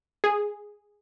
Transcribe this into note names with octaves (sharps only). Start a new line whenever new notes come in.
G#4